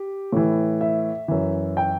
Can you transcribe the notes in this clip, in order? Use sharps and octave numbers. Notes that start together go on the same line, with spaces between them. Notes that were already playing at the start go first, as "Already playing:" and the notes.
Already playing: G4
A2 E3
E5
F#2 E3
G5